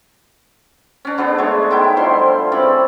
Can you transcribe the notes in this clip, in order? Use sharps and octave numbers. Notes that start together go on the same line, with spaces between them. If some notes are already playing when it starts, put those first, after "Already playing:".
C#4 D4
D3 B3 D4 A4
G#3 A3 C#5
D#3 B3 E4 G5
D3 F3 G3 C6
E3 C4 C#4 D5